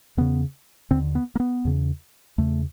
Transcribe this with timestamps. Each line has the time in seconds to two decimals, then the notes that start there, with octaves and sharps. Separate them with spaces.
0.17 E2 C#3 B3
0.91 D#2 D3 C4
1.15 B3
1.35 A#3
1.40 B3
1.65 E2 C#3
2.38 E2 C#3 A3